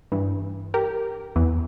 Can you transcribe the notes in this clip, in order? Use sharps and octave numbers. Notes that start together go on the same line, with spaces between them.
G2 E3
G4 A#4
E2 E3